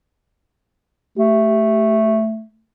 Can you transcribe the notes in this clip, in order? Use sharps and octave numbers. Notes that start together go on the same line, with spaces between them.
A3 G4